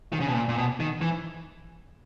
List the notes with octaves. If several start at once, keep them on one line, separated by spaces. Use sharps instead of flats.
D#3
C#3
B2
A#2
A#2
B2
D#3
E3